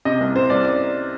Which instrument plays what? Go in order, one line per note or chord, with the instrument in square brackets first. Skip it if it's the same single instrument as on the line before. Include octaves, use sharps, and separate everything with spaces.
[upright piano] C3 D#5
C2
C3 C5
C2 D5
D5